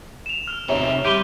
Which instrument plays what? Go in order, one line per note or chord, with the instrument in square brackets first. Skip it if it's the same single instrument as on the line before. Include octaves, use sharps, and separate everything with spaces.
[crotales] E7 F7
F6
[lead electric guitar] C3 D#4 [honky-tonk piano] C#5 E5
[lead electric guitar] G3 [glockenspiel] C6 D6 G6 [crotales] D7 D#7 G7